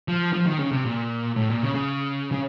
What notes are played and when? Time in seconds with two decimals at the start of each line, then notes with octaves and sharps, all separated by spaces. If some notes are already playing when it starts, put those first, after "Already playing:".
0.08 F3
0.33 F3
0.46 D#3
0.59 C#3
0.72 C3
0.85 A#2
1.36 A2
1.50 A#2
1.63 C#3
1.75 C#3
2.32 C#3